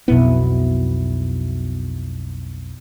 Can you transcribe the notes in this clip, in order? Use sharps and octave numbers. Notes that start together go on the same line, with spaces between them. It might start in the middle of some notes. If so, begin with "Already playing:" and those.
B1 F2 B2 B3 E4